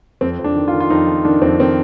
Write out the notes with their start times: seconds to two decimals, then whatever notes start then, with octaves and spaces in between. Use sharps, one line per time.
0.21 F2 C4
0.39 F2
0.44 D4
0.56 D#3
0.68 F4
0.73 D#3
0.80 F4
0.90 F2 D#4
1.07 D#3
1.25 D#3 D4
1.41 F2 C4
1.59 D#3 C4